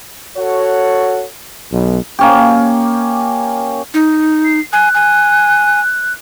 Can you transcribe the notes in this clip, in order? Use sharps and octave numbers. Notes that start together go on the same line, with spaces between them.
F#4 A4 C#5 F#5
B1
A#3 C#4 G4
D#4
C7
G#5 F#6
G#5